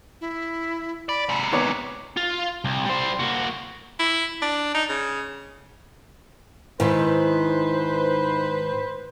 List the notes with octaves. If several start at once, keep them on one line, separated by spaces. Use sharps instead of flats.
E4
D5 B5
G#2 C3
D#3 B3 C#5 D6
F4
C2
G3 C5
A#3 F#4
E4
D4
D#4
C#3
G#2 D#3 E4 B4 C5